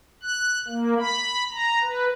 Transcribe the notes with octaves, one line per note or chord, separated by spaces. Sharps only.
F#6
A#3
B5
A#5
B4